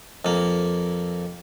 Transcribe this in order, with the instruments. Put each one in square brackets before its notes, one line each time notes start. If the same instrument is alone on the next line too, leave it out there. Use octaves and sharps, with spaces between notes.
[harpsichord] F2 A#3